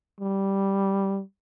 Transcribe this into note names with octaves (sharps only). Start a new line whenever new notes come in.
G3